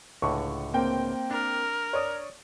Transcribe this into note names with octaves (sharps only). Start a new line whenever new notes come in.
C#2 A2 D3 C#6
A#3 C4 G5
D4 A#4
C#5 D5 D#6